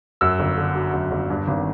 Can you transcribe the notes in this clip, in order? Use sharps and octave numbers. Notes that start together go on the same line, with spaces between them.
F#2 E6
G1
D3
F#3
F#2
G1
G2
G#1